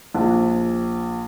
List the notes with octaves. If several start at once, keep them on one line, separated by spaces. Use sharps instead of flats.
A#1